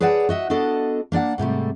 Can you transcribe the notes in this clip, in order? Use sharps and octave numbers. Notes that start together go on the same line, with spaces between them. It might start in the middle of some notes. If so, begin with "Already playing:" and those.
G#4 B4 C#5 D5 F#5 A5
F#4 D#5 E5
B3 D4 F#4 A4 D#5
A#3 D4 D5 F#5
G#2 C3 G3 A3